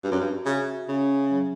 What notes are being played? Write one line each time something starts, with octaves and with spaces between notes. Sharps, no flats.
G2 F#4
F#2
G2
C#3 E5
C#3 C#4
F#3